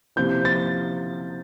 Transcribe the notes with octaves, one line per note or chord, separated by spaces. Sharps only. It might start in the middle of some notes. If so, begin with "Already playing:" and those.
C3 F3 A#3 E4 G6
A6